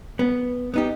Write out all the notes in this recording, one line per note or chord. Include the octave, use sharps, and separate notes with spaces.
B3
B3 D#4 G4